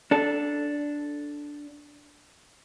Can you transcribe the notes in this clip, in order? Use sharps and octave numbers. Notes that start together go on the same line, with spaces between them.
D4 A4